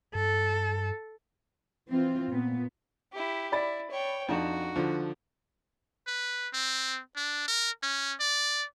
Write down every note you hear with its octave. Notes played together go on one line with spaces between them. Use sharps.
G2 A4
E3 C4 F4
A#2 B3
E4 G4
E4 D5 B5 A6
C#5 G5
F2 D4 D#4 F#4 E7
D3 F3
B4
C4
D4
A#4
C#4
D5